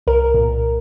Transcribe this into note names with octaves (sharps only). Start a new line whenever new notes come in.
C2 A#4
A#2